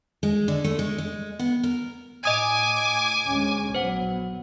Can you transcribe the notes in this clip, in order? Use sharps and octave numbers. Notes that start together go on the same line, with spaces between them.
G#3
D3
A3
G#3
G#3
B3
A#4
A2 D#5 G#5 D6 D#6 G#6
D2 G#3 C#4
A#1 F#3 B3 C5 F#5